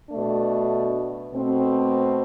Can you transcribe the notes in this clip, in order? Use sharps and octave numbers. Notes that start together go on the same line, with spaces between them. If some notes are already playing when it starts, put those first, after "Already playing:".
B2 A3 D4
B2 A3 C4